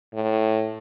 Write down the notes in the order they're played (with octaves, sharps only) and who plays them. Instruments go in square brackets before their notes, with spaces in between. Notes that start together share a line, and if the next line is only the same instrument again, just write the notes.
[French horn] A2